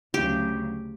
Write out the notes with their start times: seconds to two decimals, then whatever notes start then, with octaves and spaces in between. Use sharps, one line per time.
0.14 D2 C#3 F#3 G4